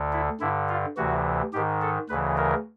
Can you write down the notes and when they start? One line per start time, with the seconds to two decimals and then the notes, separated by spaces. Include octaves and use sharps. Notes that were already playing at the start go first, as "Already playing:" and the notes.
Already playing: D2 D3
0.13 E4
0.40 G2 D3 E4
0.69 F4
0.97 D2 C3 E3 F#4
1.53 G#2 D#3 G4
1.82 A4
2.09 D2 C#3 E3 B4
2.37 A#4